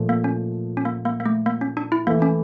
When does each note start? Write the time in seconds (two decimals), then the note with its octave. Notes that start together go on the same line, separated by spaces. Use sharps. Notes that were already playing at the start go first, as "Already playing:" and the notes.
Already playing: A#2 F3 A3
0.09 A#3
0.24 C#4
0.77 C#4
0.85 A#3
1.05 A#3
1.20 A#3
1.26 A3
1.46 A#3
1.61 C#4
1.77 D4
1.92 E4
2.07 E3 A3 A#3 E4
2.22 C#4